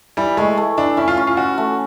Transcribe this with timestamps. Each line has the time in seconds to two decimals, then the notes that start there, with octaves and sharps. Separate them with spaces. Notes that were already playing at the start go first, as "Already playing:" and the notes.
0.17 E3 G3
0.37 G#3 A3
0.57 A3
0.77 E3 D4
0.97 C#4 E4
1.08 F4
1.17 C#4
1.27 F4
1.37 C#4 F#4
1.58 A3